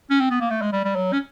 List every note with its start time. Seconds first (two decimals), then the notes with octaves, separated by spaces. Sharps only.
0.10 C#4
0.20 C4
0.30 B3
0.41 A#3
0.50 A3
0.61 G#3
0.73 G3
0.84 G3
0.95 F#3
1.13 C#4